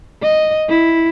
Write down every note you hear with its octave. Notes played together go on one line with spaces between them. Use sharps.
D#5
E4